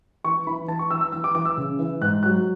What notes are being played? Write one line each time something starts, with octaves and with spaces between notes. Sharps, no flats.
E3 C#6
E3 B5
E3 A5
C#6
E3 E6
E6
E3 E6
D6
E3 D6
E6
C#3
E3
G#2 F#6
F#3 F#6